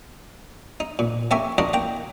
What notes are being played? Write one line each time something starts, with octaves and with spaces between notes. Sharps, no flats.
D#4
A#2
A#3 C#4 G4 C#5 E5 G#5
D4 F4 F#4 A#4 D#5
A#3 G5 A#5